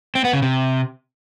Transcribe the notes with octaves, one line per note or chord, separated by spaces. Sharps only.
C4
B3
C#3
C3